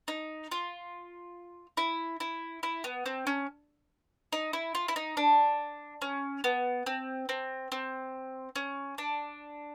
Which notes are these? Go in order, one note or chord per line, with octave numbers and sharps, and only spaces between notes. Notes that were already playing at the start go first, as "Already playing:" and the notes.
D#4
F4
E4
E4
E4
B3
C4
C#4
D#4
E4
F4
E4
D#4
D4
C#4
B3
C4
C4
C4
C#4
D4